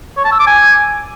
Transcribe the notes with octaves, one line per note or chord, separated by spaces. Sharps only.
C#5
A5
E6
D6
G#5